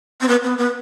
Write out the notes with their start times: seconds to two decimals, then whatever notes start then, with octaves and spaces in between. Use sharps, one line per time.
0.21 C4
0.28 B3
0.44 B3
0.58 B3